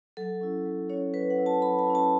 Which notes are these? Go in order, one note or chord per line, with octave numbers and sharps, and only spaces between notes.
F#3 A4
C#4 E4
F#3
C#4 E4 C#5
F#3 B4
F#5
C#4 E4
A5
F#3 B5
A5
C#4 E4
A5